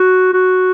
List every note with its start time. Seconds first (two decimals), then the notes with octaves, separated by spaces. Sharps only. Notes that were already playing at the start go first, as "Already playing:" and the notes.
Already playing: F#4
0.33 F#4